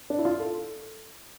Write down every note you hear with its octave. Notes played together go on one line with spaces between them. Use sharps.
D4
E4
F4
A4